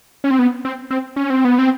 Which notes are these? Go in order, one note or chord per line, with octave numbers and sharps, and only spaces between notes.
C#4
C4
B3
C4
C4
C#4
C4
B3
C4